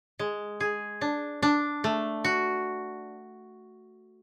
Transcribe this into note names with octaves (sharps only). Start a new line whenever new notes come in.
G#3
G#4
D4
D4
A3
F#4